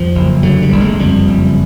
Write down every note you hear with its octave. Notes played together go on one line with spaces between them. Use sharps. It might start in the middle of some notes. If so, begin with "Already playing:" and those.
Already playing: F2 F3
F#1
D3 F#3
G3
F#1
G#3
F2 G3
F#1